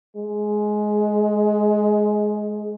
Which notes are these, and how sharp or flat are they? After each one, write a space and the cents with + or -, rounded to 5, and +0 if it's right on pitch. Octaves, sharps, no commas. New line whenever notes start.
G#3 +15